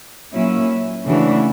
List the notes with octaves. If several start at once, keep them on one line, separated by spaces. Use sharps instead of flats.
A#2 F#3 A#3 C#4 E4
C#3 E3 A3 D4 F#4